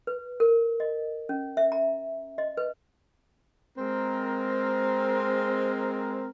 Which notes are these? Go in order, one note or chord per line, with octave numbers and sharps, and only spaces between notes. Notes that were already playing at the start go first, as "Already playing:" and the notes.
B4
A#4
D#5
C#4
E5
A#5
D#5
B4
G#3 C4 A#4